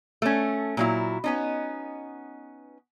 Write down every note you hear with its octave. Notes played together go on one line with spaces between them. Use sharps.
A3 C#4
A#2 F#3 E4
B3 C#4 D#4